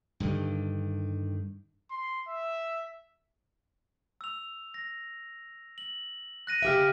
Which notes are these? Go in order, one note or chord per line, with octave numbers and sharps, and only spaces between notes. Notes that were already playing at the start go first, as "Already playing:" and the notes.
G2 D3 D#3
C6
E5
E6 F7
A#6
F#7
F#6 A#6 D#7
C#3 G4 E5 F6 D7